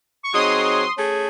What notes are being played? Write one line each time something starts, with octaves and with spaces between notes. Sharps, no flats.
C#6
F#3 C4 D#4 G#4 C#5 C6 D#6
A3 C#4 G#4